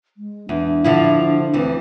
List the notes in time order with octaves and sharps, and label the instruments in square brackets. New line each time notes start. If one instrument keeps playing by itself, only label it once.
[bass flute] G#3
[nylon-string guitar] E2 [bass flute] D4
[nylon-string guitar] D3 F3 E4
[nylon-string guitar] D2 E3 [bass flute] C4